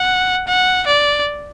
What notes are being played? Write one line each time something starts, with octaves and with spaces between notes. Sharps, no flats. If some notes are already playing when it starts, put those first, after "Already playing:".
Already playing: F#5
F#5
D5